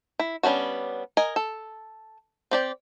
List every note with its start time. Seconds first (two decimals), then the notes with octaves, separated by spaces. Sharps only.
0.19 E4
0.43 G3 B3 C#4 D4 F#4
1.17 A#4 D#5 G#5
1.36 A4
2.51 C4 G4 D5